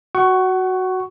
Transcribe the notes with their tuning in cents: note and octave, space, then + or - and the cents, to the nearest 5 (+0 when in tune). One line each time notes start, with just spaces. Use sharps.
F#4 +0 F#5 +25 C#6 +0